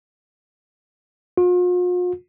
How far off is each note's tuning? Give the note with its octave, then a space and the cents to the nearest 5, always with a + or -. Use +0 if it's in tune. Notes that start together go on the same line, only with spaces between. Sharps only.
F4 +45